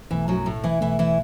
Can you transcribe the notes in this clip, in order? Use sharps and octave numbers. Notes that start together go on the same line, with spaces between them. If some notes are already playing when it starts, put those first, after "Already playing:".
B1 B2 E3 A3
F#2 F#3
A2 A3
E3 E4
B1 B2 E3 A3 E4
E3 E4